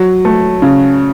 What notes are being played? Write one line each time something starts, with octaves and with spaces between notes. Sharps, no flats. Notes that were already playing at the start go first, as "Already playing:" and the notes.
Already playing: F#3
A3
C#3